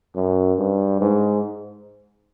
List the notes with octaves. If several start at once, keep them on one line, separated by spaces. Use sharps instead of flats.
F#2
G2
G#2